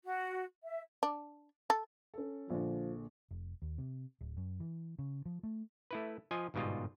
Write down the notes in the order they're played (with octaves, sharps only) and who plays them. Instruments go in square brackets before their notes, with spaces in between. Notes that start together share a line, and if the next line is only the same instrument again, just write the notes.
[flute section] F#4
E5
[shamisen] D4
A4
[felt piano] C#4 A4
[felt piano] A#1 D3 [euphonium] F3
[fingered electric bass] F1
D#2
C3
D1
F#2
E3
C#3
F3
A3
[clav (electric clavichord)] A3 E4 B4
F3 F4 D#5 G#5
G1 G#2 B2 G3 F4 D#5